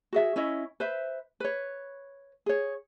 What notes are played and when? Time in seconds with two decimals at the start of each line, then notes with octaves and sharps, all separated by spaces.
0.13 F#4 G#4 E5
0.36 C#4 E4 C#5 D#5
0.80 B4 C5 E5
1.40 B4 C#5
2.46 G#4 C#5